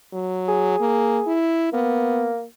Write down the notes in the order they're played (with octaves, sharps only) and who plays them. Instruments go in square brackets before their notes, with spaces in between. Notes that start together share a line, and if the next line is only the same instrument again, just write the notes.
[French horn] F#3
[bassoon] G#4
[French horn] A#3
E4
[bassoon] A#3 [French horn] B3